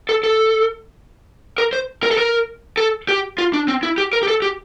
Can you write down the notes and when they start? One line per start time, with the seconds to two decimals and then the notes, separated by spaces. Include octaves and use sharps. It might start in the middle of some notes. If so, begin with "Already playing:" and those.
0.09 A4
0.23 A4
1.58 A#4
1.73 C5
2.03 A#4
2.11 A4
2.18 A#4
2.77 A4
3.09 G4
3.38 F4
3.53 D4
3.68 C4
3.83 E4
3.98 G4
4.13 A#4
4.23 G4
4.28 A4
4.42 G4